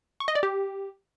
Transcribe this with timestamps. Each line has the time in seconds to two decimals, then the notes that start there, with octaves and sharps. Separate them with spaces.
0.20 C#6
0.28 D#5
0.35 D5
0.43 G4